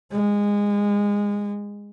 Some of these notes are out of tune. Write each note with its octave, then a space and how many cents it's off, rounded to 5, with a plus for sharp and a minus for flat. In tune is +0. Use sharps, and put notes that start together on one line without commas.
G#3 -20